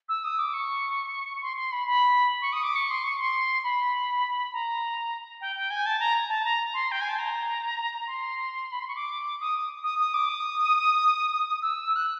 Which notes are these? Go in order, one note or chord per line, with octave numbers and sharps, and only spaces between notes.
E6
D#6
D6
C#6
C6
C6
B5
B5
C#6
D#6
D6
C#6
C6
C#6
C6
B5
A#5
G5
G5
G#5
A5
A#5
A5
A#5
C6
G5
G#5
A5
A#5
C6
B5
C6
C#6
D6
D#6
D#6
D#6
D6
D#6
E6
F#6